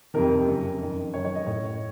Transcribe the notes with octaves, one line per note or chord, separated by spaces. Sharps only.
F2 C3 D#3 A#4
F#2 C#3
F2 D#3
F#2 D#3 C#5
C#5
D#5
A2 C#5